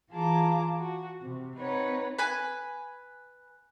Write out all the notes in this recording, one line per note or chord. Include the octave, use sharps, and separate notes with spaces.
E3 F4 G#4 A5 A#5 D6
F#4
C3
C4 D#4 B4 C#5 F#5
B4 G#5